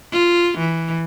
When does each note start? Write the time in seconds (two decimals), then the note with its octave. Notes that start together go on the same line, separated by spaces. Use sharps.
0.12 F4
0.58 E3